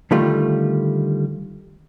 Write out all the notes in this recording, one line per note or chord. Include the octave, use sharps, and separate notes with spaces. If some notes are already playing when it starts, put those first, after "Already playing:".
D3 D#3 G3 A3 F4